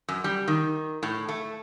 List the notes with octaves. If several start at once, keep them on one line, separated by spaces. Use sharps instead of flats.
F#2
G3
D#3
A2
A3